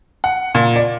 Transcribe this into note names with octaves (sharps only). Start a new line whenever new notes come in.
F#5
A#2
D5